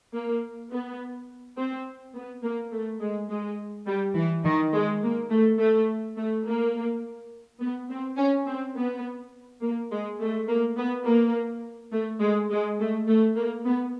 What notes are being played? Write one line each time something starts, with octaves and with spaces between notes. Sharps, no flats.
A#3
B3
C4
B3
A#3
A3
G#3
G#3
G3
E3
D#3
G#3
A#3
A3
A3
A3
A#3
B3
C4
C#4
C4
B3
A#3
G#3
A3
A#3
B3
A#3
A3
G#3
G#3
A3
A3
A#3
B3